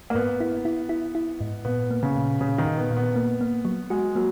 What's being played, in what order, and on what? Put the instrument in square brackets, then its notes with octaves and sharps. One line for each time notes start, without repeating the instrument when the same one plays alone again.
[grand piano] A#3
[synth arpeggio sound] G#2 [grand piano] B3
[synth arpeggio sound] E4
E4
E4
E4
G#2
[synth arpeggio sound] A#2 [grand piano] B3
[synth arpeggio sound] A#3
[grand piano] C#3
[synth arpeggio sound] A#2
[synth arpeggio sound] A#2 [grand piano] C#3
[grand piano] D#3
[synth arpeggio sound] A#2
[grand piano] B3
[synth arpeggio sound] A#2
[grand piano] B3
[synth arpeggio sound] A#3
A#3
F#3
[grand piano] G#3 [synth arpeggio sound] F#4
[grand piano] F#3 [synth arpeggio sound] A#3